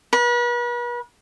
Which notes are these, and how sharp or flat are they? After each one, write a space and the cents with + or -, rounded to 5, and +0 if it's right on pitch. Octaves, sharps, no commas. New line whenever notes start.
B4 -40